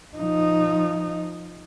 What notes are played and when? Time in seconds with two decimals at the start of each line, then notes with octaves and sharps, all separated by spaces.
0.17 F3 D#4